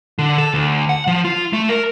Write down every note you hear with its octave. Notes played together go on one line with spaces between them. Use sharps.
D3
A4
D2
F#5
F3
F4
A3
A#4